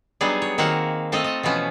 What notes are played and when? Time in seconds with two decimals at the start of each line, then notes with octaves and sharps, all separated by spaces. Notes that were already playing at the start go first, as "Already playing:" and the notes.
0.21 F#3 G3 B3 D4 D#4 G#4
0.42 C#5
0.58 D#3 A#3 C4 F#4 F5 F#5
1.12 A3 C4 F4 A4 D#5
1.24 D#5
1.43 B2 E3 F3 B3 C#4